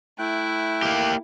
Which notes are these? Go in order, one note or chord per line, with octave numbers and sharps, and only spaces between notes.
A3 E4 G5 F#6
A#3 G4